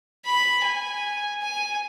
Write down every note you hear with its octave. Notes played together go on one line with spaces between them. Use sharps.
B5
G#5
G#5